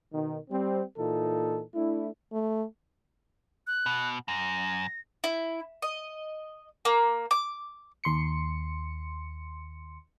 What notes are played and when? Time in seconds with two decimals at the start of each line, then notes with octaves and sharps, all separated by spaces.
0.13 B2 D#3
0.50 G3 C4
0.98 A#2 E3 D#4 F4 A4
1.75 A3 D4 E4
2.32 A3
3.67 F#6
3.86 B2
4.28 F#2 A#6
5.24 E4
5.82 D#5
6.85 A#3
7.31 D6
8.04 D#2 C6 C#7